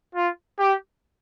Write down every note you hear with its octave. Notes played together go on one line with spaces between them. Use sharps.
F4
G4